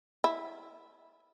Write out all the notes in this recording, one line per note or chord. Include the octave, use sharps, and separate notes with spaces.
E4